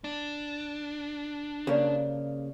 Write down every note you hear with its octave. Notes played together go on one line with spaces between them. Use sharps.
D4
C#3 A#3 G4 D5